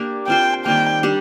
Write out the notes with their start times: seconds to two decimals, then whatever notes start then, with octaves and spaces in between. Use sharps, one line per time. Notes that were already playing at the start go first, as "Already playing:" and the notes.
Already playing: A#3 D4 G4 D5
0.28 C4 F4 C5 G5
0.65 D#3 G3 A#3 G5
1.03 G3 D4 G4